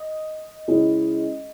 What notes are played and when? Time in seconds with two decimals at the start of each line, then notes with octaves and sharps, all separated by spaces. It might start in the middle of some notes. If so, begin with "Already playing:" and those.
Already playing: D#5
0.68 C#3 G#3 C#4 E4 G#4